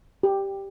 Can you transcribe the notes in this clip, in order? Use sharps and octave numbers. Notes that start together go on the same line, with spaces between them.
G4